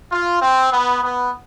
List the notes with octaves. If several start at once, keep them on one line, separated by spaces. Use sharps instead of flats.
F4
C4
B3
B3